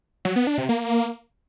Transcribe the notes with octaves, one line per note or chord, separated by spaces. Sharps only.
F#3
B3
D4
C3
A#3